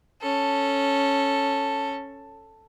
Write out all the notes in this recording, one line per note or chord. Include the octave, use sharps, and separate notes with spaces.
C#4 A4